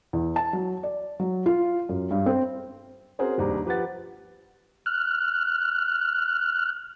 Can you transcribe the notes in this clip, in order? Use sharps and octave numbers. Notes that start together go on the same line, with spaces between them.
E2
A5
F#3
D5
F#3
F4
F#2
G2
C4
C4 C#4 F#4 G#4 A#4 C5
F1 D#2 G3 D4 G4 A#5
F3 G4 B4 F#5 A6
F6 F#6